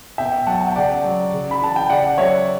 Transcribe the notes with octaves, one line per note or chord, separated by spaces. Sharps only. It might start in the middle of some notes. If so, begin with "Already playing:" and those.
B2 E5 G5
F#3 F#5 A5
A5
G5
C#3 D5 F#5
F#3
C#3
B5
E3 A5
G5
C#3 D5 F#5
F#3 C#5 E5